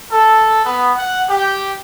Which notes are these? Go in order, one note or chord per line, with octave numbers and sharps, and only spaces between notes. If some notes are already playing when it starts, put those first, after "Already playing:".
A4
B3
F#5
G4